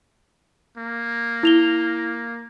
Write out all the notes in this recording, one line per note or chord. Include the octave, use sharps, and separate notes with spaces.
A#3
E4 F7 G7